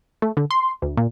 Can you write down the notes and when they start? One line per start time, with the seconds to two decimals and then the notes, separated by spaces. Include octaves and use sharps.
0.22 A3
0.37 D3
0.51 C6
0.82 D2
0.97 A#2